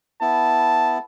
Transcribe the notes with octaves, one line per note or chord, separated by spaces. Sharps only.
B3 E4 A5